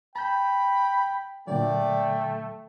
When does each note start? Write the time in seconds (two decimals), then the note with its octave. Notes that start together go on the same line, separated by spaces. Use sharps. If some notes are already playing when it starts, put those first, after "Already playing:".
0.16 G5 A5 B5 G6
1.47 A#2 D3 F#3 A3 D5 G5